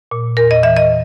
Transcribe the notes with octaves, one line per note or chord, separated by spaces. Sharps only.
A#2
E2 A#4
D#5
E3 E5
D#5